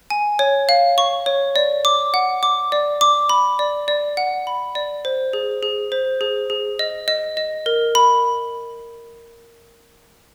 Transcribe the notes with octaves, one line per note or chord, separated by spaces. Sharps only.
G#5
C#5
F5
C#6
C#5
D5
D6
F#5
D6
D5
D6
B5
D5
D5
F#5
B5
D5
C5
G#4
G#4
C5
G#4
G#4
D#5
D#5
D#5
A#4
B5